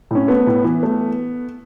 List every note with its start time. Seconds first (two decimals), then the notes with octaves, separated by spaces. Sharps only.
0.11 A2 C#4
0.28 A3 B3
0.47 A2
0.64 E3
0.83 A3